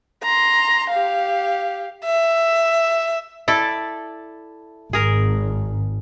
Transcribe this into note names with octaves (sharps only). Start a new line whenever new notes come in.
A#5 C6
G4 F5
E5
E4 A4 D5
G#1 G#4 A#4